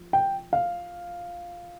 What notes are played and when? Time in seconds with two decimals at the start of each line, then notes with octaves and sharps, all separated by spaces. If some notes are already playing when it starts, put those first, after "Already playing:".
Already playing: F3
0.13 G5
0.53 F5